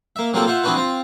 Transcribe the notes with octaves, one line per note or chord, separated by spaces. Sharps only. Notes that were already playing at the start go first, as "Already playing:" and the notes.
A#3 E5
C3 F#3 A#3 C4 F4 A4
F4 C5 E5 F#5
E3 B3 C4 D4 F#4 B4
C4 F4